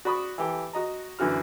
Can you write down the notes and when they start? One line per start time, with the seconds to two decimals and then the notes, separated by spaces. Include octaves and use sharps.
0.05 F#4 D5 B5 C#6 D#6
0.38 E3 G4 A4
0.73 F#4 D#5 A#5
1.19 F#2 D3 E3 F#4 F6